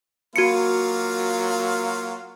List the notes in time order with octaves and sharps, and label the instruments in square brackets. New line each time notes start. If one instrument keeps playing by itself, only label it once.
[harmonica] F#3 F4 F5 [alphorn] A#3 [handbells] F#4 C#7